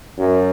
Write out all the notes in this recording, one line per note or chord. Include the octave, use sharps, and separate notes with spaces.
F#2